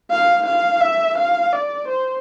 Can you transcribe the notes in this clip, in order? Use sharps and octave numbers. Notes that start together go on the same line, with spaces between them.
F5
F5
E5
F5
D5
C5